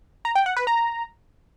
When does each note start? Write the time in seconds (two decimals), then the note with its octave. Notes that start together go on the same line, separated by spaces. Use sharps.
0.25 A#5
0.35 G5
0.46 F#5
0.57 B4
0.67 A#5